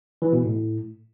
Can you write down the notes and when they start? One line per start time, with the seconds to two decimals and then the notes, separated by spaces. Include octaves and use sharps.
0.22 E3
0.33 B2
0.43 A2